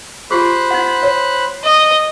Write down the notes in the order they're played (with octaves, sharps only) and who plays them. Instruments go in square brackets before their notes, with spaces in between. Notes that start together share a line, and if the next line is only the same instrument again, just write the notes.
[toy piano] F4 G4 G#4 [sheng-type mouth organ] C5 B5 F#6
[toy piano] D#4 F#5
C#5
[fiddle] D#5